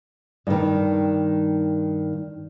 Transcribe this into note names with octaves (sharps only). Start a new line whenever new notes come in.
G2 D#3